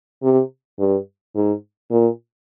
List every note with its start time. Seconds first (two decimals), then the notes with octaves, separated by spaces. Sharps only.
0.23 C3
0.79 G2
1.35 G#2
1.91 A#2